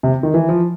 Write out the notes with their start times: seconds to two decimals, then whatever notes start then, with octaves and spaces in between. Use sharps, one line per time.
0.03 C3
0.23 D#3
0.34 E3
0.49 F3